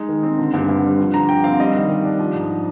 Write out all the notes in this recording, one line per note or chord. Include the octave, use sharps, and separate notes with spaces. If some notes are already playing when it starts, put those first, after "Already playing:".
Already playing: G#3 D#4
D#3
C4
D3
G2
G2
G3
F3
D3 A#5
D3 G5
C4 F5
G3 D#5
D#3
D#3
D4
F3
G#2